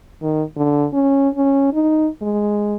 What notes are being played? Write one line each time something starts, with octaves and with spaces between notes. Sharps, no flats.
D#3
D3
C#4
C#4
D#4
G#3